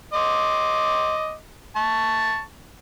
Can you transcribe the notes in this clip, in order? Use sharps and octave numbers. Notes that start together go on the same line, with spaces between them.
D#5 C6 D6
A5 C#6